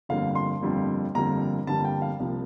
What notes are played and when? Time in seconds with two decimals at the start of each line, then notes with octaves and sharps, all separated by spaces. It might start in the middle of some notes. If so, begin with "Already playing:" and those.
0.09 G1 F2 D3 G3 A#3 F5
0.35 C6
0.61 G1 F2 D3 G3 A#3
1.15 G1 F2 D3 G3 A#3 A#5
1.67 G1 F2 D3 G3 A#3 A5
1.84 G5
2.02 F5
2.19 C2 C3 F3 A#3